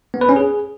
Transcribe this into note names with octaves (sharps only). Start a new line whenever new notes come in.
B3
B4
C#4
G#4